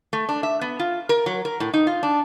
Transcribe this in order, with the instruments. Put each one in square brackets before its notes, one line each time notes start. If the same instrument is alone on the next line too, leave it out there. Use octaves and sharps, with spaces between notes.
[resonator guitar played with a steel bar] A3
D4
E5
B3
F4
A#4
F#3
A#4
A2
D#4
F4
D4